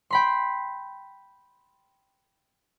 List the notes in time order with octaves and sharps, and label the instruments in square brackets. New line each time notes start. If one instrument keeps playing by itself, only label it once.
[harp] G5 B5 C6